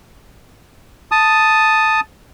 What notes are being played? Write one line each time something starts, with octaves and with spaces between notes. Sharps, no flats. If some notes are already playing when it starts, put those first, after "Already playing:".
A5 D#6